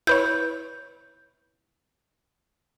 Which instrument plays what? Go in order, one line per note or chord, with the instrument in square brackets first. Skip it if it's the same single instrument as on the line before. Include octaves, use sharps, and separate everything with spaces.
[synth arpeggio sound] E4 B4 C#5 [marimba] G6